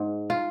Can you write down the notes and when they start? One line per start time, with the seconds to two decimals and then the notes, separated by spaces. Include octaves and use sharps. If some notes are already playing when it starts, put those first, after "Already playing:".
Already playing: G#2
0.30 F4